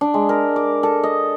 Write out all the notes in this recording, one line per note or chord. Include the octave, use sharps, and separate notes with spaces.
D4
G#3
A#4
D6
A4
D#5